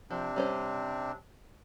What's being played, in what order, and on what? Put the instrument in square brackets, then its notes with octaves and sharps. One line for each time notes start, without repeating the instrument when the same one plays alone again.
[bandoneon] C3 C4 D4 [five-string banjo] F3
[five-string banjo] G3 C#4 C5